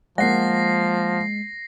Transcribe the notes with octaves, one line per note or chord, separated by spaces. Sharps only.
F3 G#3 A#3 F#5 A#6 C7